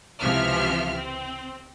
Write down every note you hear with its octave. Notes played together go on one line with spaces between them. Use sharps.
C#2 C3 E3 F3 E5 F6
C4